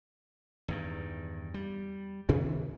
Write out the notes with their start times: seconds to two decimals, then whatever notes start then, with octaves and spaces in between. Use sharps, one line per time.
0.68 E2 G2 D#3
1.54 G3
2.29 C3 D#3 E3 B3